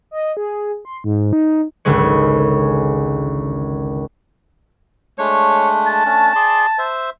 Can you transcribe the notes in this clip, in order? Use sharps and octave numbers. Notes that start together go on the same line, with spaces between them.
D#5
G#4
C6
G#2
D#4
G#1 C#2 D3 G#3 C#5
G#3 A3 D4 C#5
A5
A3 C#4 D4
G#4 D5 C6
C5 E5